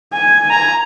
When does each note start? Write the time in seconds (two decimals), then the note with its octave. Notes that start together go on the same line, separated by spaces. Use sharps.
0.13 G#5
0.51 A#5